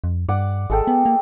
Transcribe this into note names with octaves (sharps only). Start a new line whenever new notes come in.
F2
G2 D5 F#5
G#1 G#3 A4 G5
B3
A#3